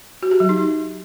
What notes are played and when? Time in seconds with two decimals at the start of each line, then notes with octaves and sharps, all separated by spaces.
0.23 F#4
0.31 G4
0.40 F#3
0.49 D#4